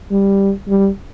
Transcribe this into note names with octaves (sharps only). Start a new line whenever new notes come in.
G3
G3